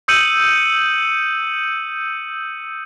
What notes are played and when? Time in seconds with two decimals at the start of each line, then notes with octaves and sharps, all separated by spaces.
0.08 D#6 E6 G6 C#7 D#7 F#7